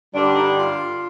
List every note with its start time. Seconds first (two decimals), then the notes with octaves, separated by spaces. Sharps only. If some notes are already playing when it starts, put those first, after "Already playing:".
0.13 G2 D3 G3 D4
0.35 D#4
0.58 F4